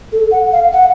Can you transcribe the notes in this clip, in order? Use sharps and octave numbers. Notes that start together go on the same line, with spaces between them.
A4
F#5
F5
F#5